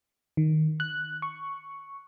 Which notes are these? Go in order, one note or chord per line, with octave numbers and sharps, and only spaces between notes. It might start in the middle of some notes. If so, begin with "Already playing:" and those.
D#3
F#6
C#6